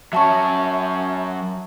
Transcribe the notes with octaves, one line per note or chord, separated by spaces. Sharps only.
F#3 C#4 E5 A5 C#6